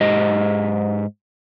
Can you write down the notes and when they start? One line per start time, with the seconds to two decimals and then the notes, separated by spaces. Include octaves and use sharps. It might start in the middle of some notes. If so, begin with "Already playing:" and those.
0.01 G#2 G4 D#5